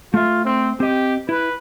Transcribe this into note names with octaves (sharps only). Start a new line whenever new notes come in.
A3 F4 E5
C4
C4 G4 D#5
E4 B4